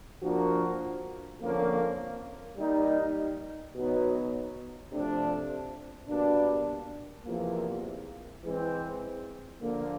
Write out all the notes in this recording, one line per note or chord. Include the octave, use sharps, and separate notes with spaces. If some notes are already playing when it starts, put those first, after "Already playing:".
F3 A#3 D4 F#4 A#4
F2 D3 F3 A#3 C#4
G3 A#3 D#4
B2 F#3 B3 D#4
C3 F3 A3 D4
B2 G3 A#3 D4
E2 C3 F3 A#3
E3 G#3 C4
D3 F3 A#3